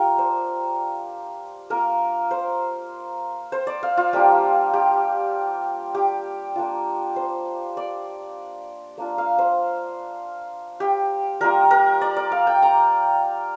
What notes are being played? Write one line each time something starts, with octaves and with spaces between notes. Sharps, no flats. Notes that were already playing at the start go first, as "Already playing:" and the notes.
Already playing: A#3 D4 F4 G4 A#4
C5
A#3 F4 A#4
C5
C5
D5
F5
F4
G3 A#3 D4 F4 G4
G4
G4
A#3 D4 F4
C5
D5
A#3 D4 F4
F5
C5
G4
G3 A#3 F4 A#4
A#4
D5
D5
F5
G5
A#5